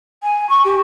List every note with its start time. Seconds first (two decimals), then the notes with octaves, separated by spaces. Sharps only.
0.23 G#5
0.49 C#6
0.65 G4